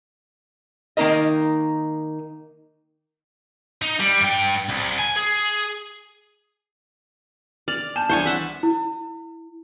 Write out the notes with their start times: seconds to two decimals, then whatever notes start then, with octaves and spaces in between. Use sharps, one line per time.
0.97 D#3 A#3 D#4 A#4 D#5
3.82 D#4
4.00 G3
4.22 G2 G5
4.69 C2
4.99 G#5
5.16 G#4
7.68 D5 F6 A6 F7
7.96 A5 G6 E7
8.09 C2 E3 D4 C5 C#5 G#5
8.26 E5 F#5 A5
8.63 E4